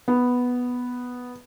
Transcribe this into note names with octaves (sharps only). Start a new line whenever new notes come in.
B3